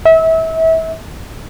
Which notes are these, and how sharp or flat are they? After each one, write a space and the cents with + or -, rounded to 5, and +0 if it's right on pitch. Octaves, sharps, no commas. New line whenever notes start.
E5 -30